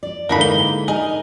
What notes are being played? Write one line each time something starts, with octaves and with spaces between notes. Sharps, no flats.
D5
G#2 D3 E3 A#3 D#4 B5
G7
D#4 G#4 A#4 D#5